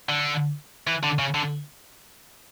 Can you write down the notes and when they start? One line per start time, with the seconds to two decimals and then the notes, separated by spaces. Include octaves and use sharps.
0.09 D3
0.87 E3
1.03 D3
1.19 C#3
1.35 D3